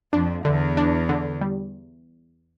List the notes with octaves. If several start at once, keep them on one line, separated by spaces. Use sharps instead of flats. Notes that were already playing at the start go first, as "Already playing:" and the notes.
F2 D4
E2 D3
D4
D3
G3